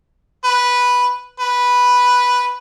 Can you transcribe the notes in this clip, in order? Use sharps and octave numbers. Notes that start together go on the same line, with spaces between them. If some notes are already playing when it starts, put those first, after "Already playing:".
B4
B4